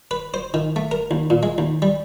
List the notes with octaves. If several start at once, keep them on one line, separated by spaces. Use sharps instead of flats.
B4
C5
D#3
A3
A#4
D#2
A#2
G#3
D#2
G3